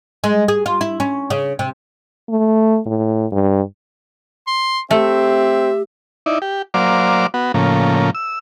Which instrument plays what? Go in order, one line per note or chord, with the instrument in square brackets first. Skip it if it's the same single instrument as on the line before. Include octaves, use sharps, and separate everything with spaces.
[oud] G#3
G#4
F4
E4
C#4
C#3
C3
[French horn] A3
A2
G2
[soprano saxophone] C6
[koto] A3 [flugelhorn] C4 [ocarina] G4 [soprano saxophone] E5
[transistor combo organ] D#4 E4 D5
G4
F#3 A#3 C5 D5 F5 D6
B3 F#4
A2 C#3 F3 A#3
E6